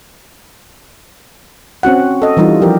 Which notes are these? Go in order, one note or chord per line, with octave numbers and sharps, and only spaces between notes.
C4 C#4 F#4 F#5
A4 D#5
E3 G3 D#4 F4
F3 G4 A#4